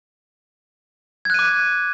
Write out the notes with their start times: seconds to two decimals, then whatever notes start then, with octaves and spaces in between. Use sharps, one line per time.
1.25 G#6
1.30 F#6
1.34 D#7
1.39 D6